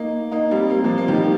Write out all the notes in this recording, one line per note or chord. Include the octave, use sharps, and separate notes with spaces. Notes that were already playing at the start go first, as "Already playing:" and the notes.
Already playing: A#3 D#4
A#3 D#4
G3 C4
A#3
C4
F3 A#3
A#3
D#3 G3